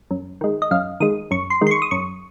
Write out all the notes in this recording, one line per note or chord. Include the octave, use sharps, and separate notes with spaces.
F#2
D#3 G#3
D#5
F#2 F5
D#3 G#3 D#6
F#2 C#6
C6
D#3 G#3
C6
C#6
D#6
F#2 C#6